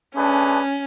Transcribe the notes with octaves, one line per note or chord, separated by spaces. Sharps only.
A3 C#4 D4 G#4 B4